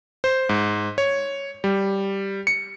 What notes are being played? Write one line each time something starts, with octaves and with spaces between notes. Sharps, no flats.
C5
G#2
C#5
G3
C#7